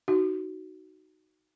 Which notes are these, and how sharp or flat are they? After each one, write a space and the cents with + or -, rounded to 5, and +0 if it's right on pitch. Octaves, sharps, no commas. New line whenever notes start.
D#4 +0 F#4 +10